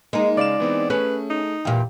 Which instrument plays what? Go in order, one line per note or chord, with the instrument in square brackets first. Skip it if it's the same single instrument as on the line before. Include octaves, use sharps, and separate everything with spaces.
[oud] G#3 D#4 [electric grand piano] A#3
[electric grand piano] C#3 F5 E7 [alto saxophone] D5
[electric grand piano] E3 B3 C4
[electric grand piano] A3 G#4 [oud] C#4 [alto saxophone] B4
[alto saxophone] D#4
[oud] E2 A#2 [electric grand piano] G4 F5 G5